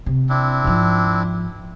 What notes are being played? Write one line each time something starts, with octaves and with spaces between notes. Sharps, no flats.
C3
C4 D4 E4
G#2 F3